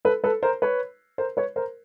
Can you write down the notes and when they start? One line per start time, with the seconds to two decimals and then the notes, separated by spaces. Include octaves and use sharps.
0.05 A4 B4
0.24 A4 B4
0.43 A#4 C5
0.62 B4 C#5
1.18 A#4 C5
1.37 B4 C#5
1.56 A#4 C5